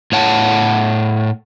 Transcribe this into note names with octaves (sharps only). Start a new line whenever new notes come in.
A2 C#5 F#5 A5